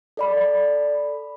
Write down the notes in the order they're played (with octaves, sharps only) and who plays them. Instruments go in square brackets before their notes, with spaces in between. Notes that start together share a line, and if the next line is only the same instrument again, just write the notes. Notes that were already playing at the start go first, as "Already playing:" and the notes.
[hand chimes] A4 D5 B5